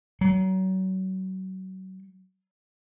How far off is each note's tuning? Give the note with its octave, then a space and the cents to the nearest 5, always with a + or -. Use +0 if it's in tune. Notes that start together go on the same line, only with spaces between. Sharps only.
F#3 +30